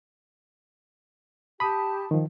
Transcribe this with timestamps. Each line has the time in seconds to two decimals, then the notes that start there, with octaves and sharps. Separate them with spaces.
1.60 G4 A5 B5 D#6
2.11 D#3 F3